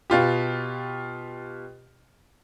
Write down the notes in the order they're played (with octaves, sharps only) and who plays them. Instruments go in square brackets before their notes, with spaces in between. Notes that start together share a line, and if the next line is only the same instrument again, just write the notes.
[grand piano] B2 F4 G4